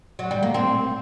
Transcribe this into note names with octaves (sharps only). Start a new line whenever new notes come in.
F#3
G3
A#3
C4